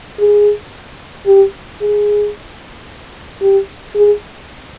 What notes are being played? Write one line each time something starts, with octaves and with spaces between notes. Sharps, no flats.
G#4
G4
G#4
G4
G#4